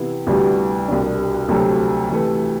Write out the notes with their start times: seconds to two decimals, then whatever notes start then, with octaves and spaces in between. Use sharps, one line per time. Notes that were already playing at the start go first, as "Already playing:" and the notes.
Already playing: C3 E3 B3 E4
0.27 D2 C3 G3 B3 E4
0.88 C2 B2 G3 D4
1.49 D2 C3 F#3 A3 C4
2.10 C3 E3 A3